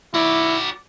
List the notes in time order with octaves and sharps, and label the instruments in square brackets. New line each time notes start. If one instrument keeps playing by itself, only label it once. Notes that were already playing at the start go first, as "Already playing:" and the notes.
[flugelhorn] E4 [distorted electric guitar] F#4 D5